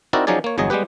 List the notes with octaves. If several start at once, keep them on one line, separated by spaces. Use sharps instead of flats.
C4 D#4 E4 F#4 A#4 D5
F3 F#3 C#4 D#4 G#4 D5
A#3 C#5
G1 E2 F#3 G#4 D#5
G3 G#3 B3 G4 B4